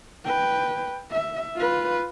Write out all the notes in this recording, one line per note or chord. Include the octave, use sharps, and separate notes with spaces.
B4 G5
E5
F4 B4